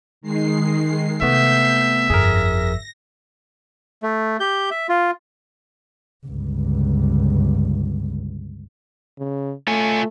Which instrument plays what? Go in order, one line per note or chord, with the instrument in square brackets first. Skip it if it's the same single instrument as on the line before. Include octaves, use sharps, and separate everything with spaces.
[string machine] D#3 G#3 C7
[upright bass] C3 [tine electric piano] A3 B3 [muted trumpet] E5 [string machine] G6 C7
[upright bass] G1 F2 [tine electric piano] G#4 A#4 [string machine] A#6
[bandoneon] A3
G4 G6
E5
F4
[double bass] G1 C#2
[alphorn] C#3
[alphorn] A3 [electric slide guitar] F4 C#5 G#5